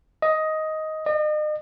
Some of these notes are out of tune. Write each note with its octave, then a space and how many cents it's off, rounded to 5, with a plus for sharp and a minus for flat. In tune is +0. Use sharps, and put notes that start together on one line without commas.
D#5 +10
D#5 -40